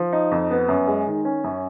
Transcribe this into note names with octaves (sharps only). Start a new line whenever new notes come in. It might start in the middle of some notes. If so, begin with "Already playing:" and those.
Already playing: F3
D#4
F2
B3
F#2
G#3
D#3
C#4
F#2